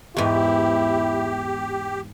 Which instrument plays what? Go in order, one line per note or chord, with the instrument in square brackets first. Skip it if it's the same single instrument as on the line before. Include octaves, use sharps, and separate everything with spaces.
[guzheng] E2 G#2 [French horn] E4 [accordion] G4